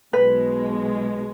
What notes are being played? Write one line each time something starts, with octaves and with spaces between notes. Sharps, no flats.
B1 B2 G#3 B4